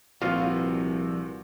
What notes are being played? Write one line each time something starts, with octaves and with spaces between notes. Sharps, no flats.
C2 A#2 F3 C4 F4 F#4 B4 D5